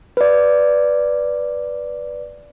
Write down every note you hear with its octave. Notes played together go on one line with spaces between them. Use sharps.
B4 D5